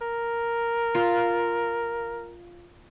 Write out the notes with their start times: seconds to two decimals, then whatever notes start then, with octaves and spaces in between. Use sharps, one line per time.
0.01 A#4
0.95 F4